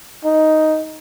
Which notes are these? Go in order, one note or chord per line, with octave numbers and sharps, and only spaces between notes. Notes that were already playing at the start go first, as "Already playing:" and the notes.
D#4